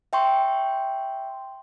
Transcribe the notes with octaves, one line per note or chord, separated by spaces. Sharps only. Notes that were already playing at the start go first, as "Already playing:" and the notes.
E5 G5 C6 C#6